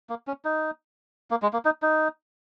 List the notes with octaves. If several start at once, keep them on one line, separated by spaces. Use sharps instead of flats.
A#3
C#4
D#4
A#3
G#3
A#3
D#4
D#4